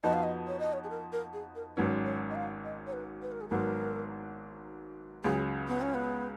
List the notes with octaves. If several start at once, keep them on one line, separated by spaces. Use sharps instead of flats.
F2 F3 B3 D#4 F#4 D#5
F5
D#5
C#5
D#5
C#5
G#4
A#4
A#4
G#4
A#4
G#1 G#2 F#3 C#4 B4
C#5
D#5
F5
D#5
C#5
B4
B4
A#4
G#4
G#1 G#2 F#3 B3 A#4
C#2 C#3 F#3 G#4
B3
C#4
B3